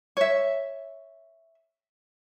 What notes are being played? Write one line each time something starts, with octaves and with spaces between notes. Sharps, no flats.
C#5 E5